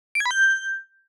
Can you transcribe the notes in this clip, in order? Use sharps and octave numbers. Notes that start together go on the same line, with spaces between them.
D7
G#6
B5
G6